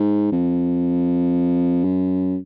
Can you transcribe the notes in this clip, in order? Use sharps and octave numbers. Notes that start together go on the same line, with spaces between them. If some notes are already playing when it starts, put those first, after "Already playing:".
Already playing: G#2
F2
F#2